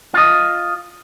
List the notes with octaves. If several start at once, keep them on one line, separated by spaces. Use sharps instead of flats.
F4 D#5